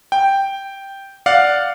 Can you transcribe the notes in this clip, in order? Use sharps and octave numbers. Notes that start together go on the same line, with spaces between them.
G5
D5 F5 F#5